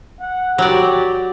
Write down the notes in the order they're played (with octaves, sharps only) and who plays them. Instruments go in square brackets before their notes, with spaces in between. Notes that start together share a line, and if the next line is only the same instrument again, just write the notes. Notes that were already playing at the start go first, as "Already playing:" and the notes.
[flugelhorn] F#5
[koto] F#3 D5 [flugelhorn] G4